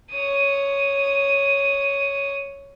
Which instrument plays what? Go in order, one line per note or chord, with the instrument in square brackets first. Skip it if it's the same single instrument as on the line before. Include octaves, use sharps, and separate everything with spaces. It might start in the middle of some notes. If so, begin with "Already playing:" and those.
[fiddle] C#5 D#6